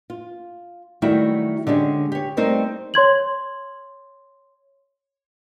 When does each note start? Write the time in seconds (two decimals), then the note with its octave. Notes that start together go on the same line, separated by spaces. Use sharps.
0.10 F4
1.02 D#3 F#3 G3 A3 E4 F#4
1.67 D3 G#3 C#4 G4
2.12 G4 C#5
2.37 G3 A3 C4 D#4 A#4 C5
2.94 C#5 C6 G#6 F#7